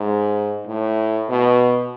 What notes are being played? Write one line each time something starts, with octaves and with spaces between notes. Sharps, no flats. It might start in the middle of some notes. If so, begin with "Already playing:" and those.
Already playing: G#2
A2
B2